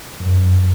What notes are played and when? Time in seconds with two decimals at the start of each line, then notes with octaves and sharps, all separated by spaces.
0.20 F#2